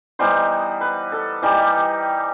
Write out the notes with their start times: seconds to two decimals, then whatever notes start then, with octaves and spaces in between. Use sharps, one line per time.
0.19 E3 G3 B3 D#4 C5
0.81 B4
1.12 A4
1.42 E3 G3 D#4 G4